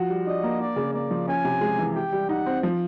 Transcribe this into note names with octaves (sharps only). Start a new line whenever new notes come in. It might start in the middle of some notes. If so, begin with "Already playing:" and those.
Already playing: F3 F#4
G3
D4 D#5
A#3
D4 D5
C#3
A#3 D5
F3
C#4 G#5
C3
G#3
E3
G4 G5
G3
D#4 F#5
C4
F3